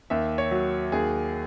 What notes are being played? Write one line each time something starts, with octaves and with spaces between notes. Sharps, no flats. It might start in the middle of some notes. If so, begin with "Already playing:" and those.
D#2 E5
C#5
F#3
D#2 G#4